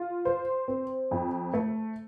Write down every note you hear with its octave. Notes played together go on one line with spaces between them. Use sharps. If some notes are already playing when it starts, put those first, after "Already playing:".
Already playing: F4
C5
C4
F2
A3